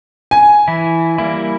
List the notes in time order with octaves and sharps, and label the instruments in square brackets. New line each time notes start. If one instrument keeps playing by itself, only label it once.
[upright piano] G#5
[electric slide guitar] E3 E4
G3 A#3 E4